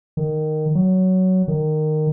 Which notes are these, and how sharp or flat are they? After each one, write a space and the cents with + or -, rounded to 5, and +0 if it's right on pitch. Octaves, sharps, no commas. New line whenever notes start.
D#3 -10
F#3 +10
D#3 -15